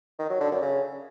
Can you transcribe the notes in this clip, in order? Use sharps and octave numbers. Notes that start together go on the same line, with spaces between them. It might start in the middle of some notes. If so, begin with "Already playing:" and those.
D#3
F#3
D3
F#2
C#3